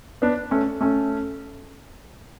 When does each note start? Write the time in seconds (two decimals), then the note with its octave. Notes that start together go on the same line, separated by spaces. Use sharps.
0.22 B3 D4
0.51 A3 C#4
0.81 A3 C#4